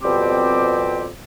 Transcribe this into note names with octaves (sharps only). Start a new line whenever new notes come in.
F2 B2 G3 C4 G4 D6